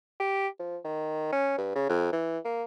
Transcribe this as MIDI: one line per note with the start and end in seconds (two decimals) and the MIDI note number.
0.20 0.48 67
0.59 0.77 53
0.85 1.30 51
1.32 1.53 61
1.58 1.75 43
1.75 1.86 49
1.89 2.10 41
2.13 2.39 52
2.45 2.64 58